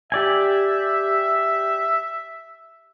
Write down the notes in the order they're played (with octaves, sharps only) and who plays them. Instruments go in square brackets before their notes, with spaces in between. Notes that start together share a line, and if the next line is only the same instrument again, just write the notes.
[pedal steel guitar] G4 D5 G#5 [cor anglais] E5